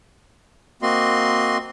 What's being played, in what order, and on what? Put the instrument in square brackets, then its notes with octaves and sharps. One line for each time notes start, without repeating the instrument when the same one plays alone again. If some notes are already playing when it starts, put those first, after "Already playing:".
[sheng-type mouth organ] A#3 C4 F#4 D#5 C6